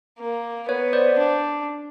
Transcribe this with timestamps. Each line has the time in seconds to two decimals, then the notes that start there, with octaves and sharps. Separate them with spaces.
0.19 A#3
0.69 B3 B4 C#5
0.93 C5 D5
1.19 D4